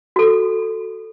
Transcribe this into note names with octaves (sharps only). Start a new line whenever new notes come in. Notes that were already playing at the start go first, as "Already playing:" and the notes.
F#4 A4